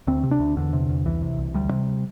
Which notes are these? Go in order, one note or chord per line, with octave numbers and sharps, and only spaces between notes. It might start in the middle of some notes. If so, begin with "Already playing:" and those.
D2 C4
C3
D4
D2
E2 D3
C3
E2
C2 E3
C3
C2
D2 G3
C3